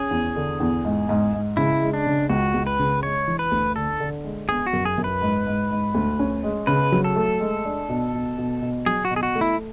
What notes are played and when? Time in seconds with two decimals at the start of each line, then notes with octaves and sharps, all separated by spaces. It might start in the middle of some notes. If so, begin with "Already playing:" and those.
Already playing: C#4 G#4
0.11 E2
0.36 D3
0.60 E2
0.85 G#2
1.09 G#2
1.33 G#2
1.57 C#3 E4
1.82 G#3
1.93 D4
2.06 C#3
2.30 C#2 F#4
2.54 C#2
2.67 B4
2.79 C#3
3.03 G#3 C#5
3.28 E3
3.39 B4
3.51 D2
3.76 D3 A4
4.00 D3
4.24 G#3
4.49 B3 G#4
4.67 F#4
4.73 F#2
4.85 G#4
4.98 F#2
5.04 B4
5.22 G#2
5.47 G#2
5.71 G#2
5.94 D2
6.19 C#4
6.43 G#3
6.67 C#3 B4
6.92 F#3
7.04 A4
7.16 A3
7.40 G#3
7.65 D4
7.89 B2
8.14 B2
8.38 B2
8.62 B2
8.86 F#3 G#4
9.05 F#4
9.10 B2
9.16 G#4
9.23 F#4
9.35 A3
9.41 E4